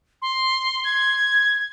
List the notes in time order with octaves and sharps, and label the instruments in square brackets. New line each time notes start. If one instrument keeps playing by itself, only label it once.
[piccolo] C6
G#6